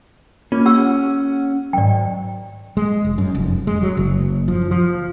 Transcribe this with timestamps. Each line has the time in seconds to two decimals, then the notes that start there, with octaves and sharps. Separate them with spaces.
0.52 A#3 C#4 F4
0.66 G4 F#5 C#6 E6
1.73 G#2 D#3 F#3 D5 G5
2.77 G#3
3.05 F1
3.18 F#2
3.35 F1
3.67 G#3
3.83 F#3
3.97 F#1
4.48 F3
4.71 F3